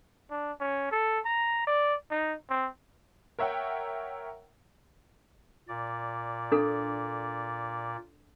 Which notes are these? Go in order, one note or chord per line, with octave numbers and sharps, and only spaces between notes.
D4
C#4
A4
A#5
D5
D#4
C4
A#4 C#5 E5 F#5 G5
A#2 D5
D4 A4